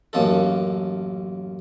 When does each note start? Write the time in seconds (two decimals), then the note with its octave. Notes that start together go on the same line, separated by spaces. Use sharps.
0.13 A1 F#2 A#3 C#4 D#4 A4